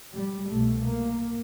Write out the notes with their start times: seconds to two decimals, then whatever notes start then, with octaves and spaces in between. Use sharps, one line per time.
0.14 G3
0.51 C2 B2 A3
0.88 A#3